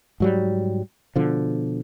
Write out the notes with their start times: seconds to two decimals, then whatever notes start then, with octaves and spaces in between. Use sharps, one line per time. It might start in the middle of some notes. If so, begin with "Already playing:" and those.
0.20 G#2 F#3 G3
1.16 B2 D3 F3